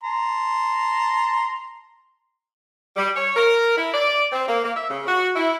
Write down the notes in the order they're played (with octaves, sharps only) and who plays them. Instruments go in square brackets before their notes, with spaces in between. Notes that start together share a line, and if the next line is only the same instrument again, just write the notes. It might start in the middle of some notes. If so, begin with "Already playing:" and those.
[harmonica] A5 A#5 C6
[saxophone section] G3
C#5
A#4
E4
D5
C4
A#3
A#3
E5
C#3
F#4
E4